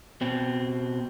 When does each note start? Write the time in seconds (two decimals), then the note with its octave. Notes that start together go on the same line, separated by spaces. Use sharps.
0.21 B2 C4